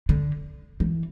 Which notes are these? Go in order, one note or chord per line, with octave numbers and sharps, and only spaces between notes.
D3
E3